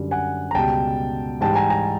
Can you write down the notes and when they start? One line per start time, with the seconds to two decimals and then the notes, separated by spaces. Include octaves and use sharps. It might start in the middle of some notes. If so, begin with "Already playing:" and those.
Already playing: F#2 D3 G3
0.11 F#5 G#5
0.51 A#5
0.55 C#2 B2 G3 G5 A5
1.41 G#2 E3 G3 G5 A5
1.55 G#5 A#5
1.70 G#5 A#5